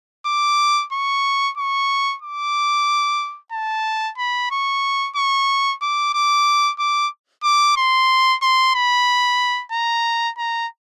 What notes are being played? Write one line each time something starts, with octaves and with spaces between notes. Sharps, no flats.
D6
C#6
C#6
D6
A5
B5
C#6
C#6
D6
D6
D6
D6
C6
C6
B5
A#5
A#5